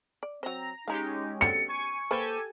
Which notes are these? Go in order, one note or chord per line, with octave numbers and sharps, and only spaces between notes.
D5
F#3 C4 C5 A#5
G#3 C#4 D#4 G4 F5 A#5
C4 D4 F#4 A4 C#7
G#5 C#6
A#3 G4 A4 B4 C5 G#5